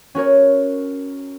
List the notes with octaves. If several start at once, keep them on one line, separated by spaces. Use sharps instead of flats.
C#4 F#4 A#4 C#5